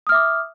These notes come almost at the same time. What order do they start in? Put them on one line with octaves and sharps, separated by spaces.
D#6 F6 E5 D6